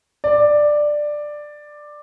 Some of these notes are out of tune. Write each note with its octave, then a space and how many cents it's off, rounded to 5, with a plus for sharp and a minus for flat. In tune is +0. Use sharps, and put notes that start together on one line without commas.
D5 +10